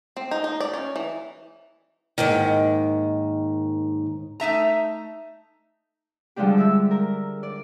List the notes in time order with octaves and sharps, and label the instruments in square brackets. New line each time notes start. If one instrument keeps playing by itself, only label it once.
[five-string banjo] C4
D#4
D#4
D5
C#4
E3
[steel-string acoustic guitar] D#2 G#2 D#3
[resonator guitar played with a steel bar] A3 D#4 E5 A#5
[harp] D3 F3 G3 G#3 D4 G4
E5 E6
A#4
D5